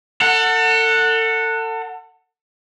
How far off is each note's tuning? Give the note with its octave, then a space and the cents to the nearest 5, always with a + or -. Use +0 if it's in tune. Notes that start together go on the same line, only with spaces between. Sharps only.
A4 +35 F#5 -5